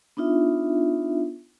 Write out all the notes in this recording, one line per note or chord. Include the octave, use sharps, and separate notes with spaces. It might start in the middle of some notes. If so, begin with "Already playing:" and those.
B3 D4 D#4 F4 E5